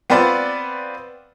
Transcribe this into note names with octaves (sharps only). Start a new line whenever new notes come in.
B3 C4 F4 B4 D5